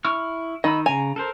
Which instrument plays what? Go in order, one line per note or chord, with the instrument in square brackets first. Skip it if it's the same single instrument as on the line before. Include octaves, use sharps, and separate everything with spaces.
[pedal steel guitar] E4 C#6 F6
[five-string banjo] D#3 [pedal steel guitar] D#5 B5 E6
[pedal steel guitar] C#3 A#5 [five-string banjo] G#5
[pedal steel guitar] A4 A#4 C5